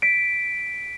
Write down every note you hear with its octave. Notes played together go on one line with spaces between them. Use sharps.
B6 D7